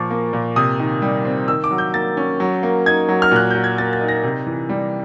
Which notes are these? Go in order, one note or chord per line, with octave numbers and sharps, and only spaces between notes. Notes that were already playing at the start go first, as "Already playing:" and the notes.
Already playing: A#2 F3 C#6 D6
A#3
A#2
C3 D#6
D#3
G3
C4
D#3 E6
D6
F#3
G6
A#3 A6
C#4
F#3
A#3
D#4 G#6
F#3
F6
A#2 F#6
F#3 G6
G#6
A#3 A6
A6
D#4
A#6
C3
E3
G3